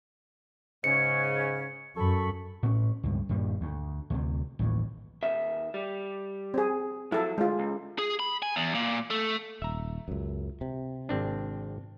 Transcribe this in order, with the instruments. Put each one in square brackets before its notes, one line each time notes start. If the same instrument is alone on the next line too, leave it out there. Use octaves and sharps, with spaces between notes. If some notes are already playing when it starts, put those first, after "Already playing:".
[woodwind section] G#2 C#3 C#4 [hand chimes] C#7
[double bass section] F#2 [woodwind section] A4 B5 C#6
[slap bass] A2 C#4
C#2 G2
D#1 G2 G3
D2
D2 C3
A1 D#2 A2
[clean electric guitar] D#2 E5
G3
[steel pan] C4 G#4
[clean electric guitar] F3 F#3 [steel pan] E4 A4
[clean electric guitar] D2 [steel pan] G#3 F4
[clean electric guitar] C#2
[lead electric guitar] G#4
B5
G#5
E2
A#2
A3
[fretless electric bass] D#1 [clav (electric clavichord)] E5 A#5
[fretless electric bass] C#2 F#2
C3
[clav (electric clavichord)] G#1 C4 D4